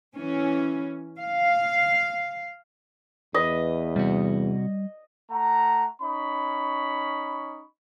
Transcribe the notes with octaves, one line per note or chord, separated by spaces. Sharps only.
E3 C#4
F5
E2 B4 D#5
C3 G3 F#4
A3 F#5 A#5
C#4 D#4 B5 C#6